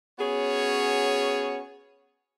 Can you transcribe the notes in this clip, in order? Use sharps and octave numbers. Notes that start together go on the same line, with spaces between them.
B3 C#4 F#4 G#4 C#5